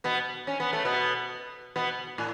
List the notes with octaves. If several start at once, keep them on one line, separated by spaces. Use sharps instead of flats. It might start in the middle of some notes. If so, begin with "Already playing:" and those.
B2 B3
C#4
B3
A3
B2 B3
B2 B3
A2